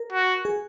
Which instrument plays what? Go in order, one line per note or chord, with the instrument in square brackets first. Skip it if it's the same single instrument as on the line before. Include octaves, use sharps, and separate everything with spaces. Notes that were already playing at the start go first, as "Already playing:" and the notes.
Already playing: [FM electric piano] A#4
[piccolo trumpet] F#4
[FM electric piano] G#4